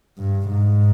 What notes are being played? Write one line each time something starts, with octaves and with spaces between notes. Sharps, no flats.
G2
G#2